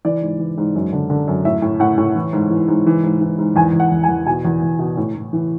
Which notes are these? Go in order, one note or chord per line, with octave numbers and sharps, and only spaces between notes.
E3 D5
G#2
E3
G#2
F#2
D3
D3
F#2
A2 E5
A2
A2 F#5
A2
E3
G#2
E3
G#2
E3
G#2
E3
G#2
E2 G#5
E2
F#5
E2
G#5
E2
B2 G#5
E2
E2
B2
A2
A2
E3